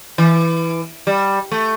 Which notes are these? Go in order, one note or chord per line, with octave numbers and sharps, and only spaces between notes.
E3
G3
A3